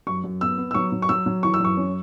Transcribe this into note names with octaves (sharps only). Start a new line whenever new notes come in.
F#2 C#6
F#2
B3 E6
B3
E6
F#3 C#6
F#3
C#6
F#3 E6
F#3
E3 C#6
E6
F#2 C#6
C#4